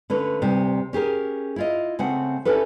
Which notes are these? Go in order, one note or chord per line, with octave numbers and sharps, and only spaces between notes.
D3 A3 C#4 B4
D2 C3 G3
C#4 G4 G#4 A#4
E4 F4 D#5
C#3 A3 C4 F#5
C#4 D4 E4 G4 A4 B4